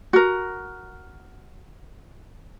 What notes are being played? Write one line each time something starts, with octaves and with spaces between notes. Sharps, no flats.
F#4 A#4